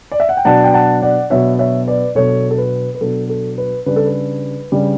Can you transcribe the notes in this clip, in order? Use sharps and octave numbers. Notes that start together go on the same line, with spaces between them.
D5
E5
F#5
G5
B2 F#3 B3 D4 F#5 A5
G5
F#5 A5
D5 F#5
B2 F#3 B3 D4 C#5 E5
C#5 E5
B4 D5
B2 F#3 B3 D4 A4 C#5
A4
B4
B4
B2 F#3 B3 D4 A4
A4
B4
C#3 G3 D4 B4
A4
B4
C#3 G3 D4